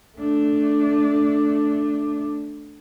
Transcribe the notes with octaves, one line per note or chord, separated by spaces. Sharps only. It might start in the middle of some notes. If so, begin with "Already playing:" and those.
A3 D4